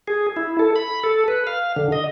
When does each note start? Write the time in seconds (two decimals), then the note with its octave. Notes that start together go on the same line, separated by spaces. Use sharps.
0.08 G#4
0.36 E4
0.59 A4
0.76 B5
1.03 A4
1.28 B4
1.47 F5
1.76 D3
1.92 D#5